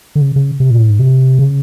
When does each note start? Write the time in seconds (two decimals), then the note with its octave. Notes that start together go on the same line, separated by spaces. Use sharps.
0.15 D3
0.21 C#3
0.36 C#3
0.60 C3
0.71 A#2
0.80 A2
0.90 G#2
0.99 C3
1.39 C#3